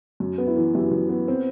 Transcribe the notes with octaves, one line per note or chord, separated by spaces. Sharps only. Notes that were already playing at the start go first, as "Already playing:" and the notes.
F#2
B3
E4
E3
F#2 E4 G4
F#2
B3
C4